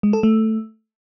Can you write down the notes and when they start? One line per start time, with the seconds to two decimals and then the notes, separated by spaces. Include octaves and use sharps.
0.03 G#3
0.13 A4
0.23 A3